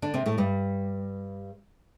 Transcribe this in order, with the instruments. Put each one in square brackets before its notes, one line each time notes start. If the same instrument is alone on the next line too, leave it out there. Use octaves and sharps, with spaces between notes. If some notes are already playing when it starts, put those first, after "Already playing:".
[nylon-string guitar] D3 D4
C3 C4
A2 A3
G2 G3